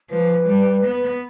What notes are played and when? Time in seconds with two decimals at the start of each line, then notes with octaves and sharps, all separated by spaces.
0.10 F3 B4
0.48 G3
0.85 B3